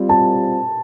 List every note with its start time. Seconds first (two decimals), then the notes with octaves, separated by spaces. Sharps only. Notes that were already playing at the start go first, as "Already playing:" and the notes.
Already playing: G3 C4 F4
0.09 A5